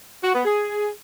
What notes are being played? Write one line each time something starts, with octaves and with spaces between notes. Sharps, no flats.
F#4
B3
G#4